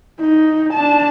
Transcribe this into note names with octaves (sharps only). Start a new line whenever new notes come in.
D#4
D4 A5